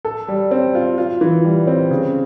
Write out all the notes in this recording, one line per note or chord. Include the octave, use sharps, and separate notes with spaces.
A4
G3
C4
F4
F4
E3
G3
C4
C#3